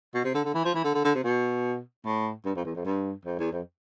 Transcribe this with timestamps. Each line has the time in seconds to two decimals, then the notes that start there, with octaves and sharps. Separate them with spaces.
0.14 B2
0.24 C3
0.34 D3
0.44 D3
0.54 E3
0.65 F3
0.75 E3
0.84 D3
0.94 D3
1.05 D3
1.15 C3
1.24 B2
2.05 A2
2.45 G2
2.56 F2
2.65 E2
2.75 F2
2.85 G2
3.25 F2
3.39 E2
3.52 F2